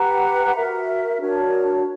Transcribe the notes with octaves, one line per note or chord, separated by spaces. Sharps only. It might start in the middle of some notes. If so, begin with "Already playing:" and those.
Already playing: G4 B4 F#5 A#5
F#4 A#4 E5
D4 F#4 A#4 C#5